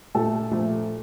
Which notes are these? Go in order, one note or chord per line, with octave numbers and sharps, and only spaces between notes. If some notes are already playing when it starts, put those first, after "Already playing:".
A#2 A3 A4
A#2 F3 A3